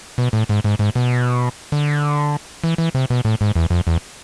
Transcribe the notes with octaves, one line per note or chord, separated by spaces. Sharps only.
B2
A2
G#2
G#2
G#2
B2
D3
E3
E3
C3
B2
A2
G#2
E2
F2
E2